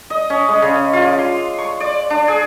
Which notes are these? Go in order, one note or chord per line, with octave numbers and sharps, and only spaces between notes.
D#5
C#4
G#3
C#3
F4
D6
C6
C#6
D5
D4
G#4